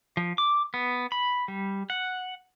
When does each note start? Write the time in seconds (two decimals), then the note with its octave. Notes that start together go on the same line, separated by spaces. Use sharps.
0.17 F3
0.38 D6
0.74 B3
1.12 B5
1.48 G3
1.90 F#5